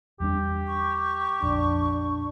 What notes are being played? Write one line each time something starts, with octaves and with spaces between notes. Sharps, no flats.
E2 G3 D4 G4
C#6
A#1 F2 D4